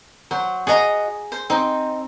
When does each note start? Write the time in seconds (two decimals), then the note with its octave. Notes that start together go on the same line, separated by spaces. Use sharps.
0.31 F#3 C5
0.67 F#4 G#4 D#5 A#5
1.32 C5
1.50 C4 D#4